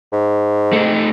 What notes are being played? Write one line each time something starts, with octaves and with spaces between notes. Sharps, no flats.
G#2
A3 D#4